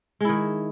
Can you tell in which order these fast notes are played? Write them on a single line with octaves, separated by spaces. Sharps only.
G#3 E4 D#3